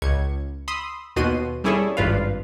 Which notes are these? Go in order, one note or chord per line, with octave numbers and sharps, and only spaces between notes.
C#2 G#6 C#7
B5 C6 D#6 E6
D#2 B2 F#4 C6 D#7
G3 C#4 E4 G#4 A4 C#5
G#1 G2 F4 B4 F5